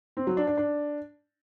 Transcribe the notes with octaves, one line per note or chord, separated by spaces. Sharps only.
C4
F#3
D4
D4
D4